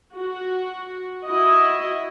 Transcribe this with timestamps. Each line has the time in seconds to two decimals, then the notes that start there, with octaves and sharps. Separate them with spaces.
0.16 F#4
1.26 E4 F#4 D#5